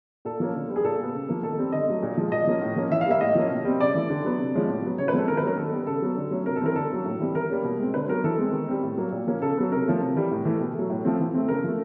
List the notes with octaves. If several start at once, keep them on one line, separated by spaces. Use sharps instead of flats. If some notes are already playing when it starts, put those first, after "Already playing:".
A#2 A4
F3 A#3 C#4
D3
G3 B3
G#4
A#2 A4
G3 B3
C#3
F3 A#3
D#3 A4
G3 C4
D3 D#5
F#3 A3
A#2
F3 G#3
A#2 D#5
F3 A#3 C#4
A2
F3 A#3 C#4
E3 E5
F5
G3 A#3 E5
A2 D#5
F3 A#3 C#4
B2
G3 C4
C#3 D5
E3 A3
D3
F#3 B3
C3
F3 G#3 C#4
A2
F#3 B3
C#3 C#5
B4
F3 G#3 C4 A4
D#3 A#4
B4
F#3 A#3 C#4 A#4
D#3 A4
G3 B3
C#3 A4
F#3 B3
D3
F#3 A3 C#4
C3 A#4
A4
E3 G3 C4 A#4
D3 A4
F#3 A#3 C#4
A2
E3 G3 C4
E3 A#4
G3 A#3 C#4
B2
G#3 C4
D3 B4
F#3 B3 A#4
E3 A4
G#3 C4
D#3
G3 C4
A2
F#3 A#3
A#2
F3 A#3 C#4
C#3 A4
F#3 B3
C3 A#4
F3 A3 C#4
C3
E3 G3
A2
E3 A3
B2
F#3 A3
A2
F3 A3 C4
E3
A3 C4
C#3 A#4
F3 A3